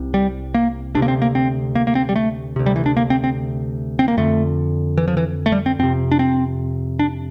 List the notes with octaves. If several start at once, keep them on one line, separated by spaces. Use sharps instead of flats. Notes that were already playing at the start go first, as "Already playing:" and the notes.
Already playing: C2 C3
G3
A#3
D2 C3 D4
A#3
C4
A#3
C4
A#3
A#3
C4
G3
A3
D2 C3
G3
E3
D4
A#3
C4
C4
C4
A#3
F2 D3 A3
E3
F3
E3
A3
G3
C4
F2 C3 C4
D4
C4
D4